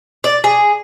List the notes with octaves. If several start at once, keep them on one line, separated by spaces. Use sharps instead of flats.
D5
G#4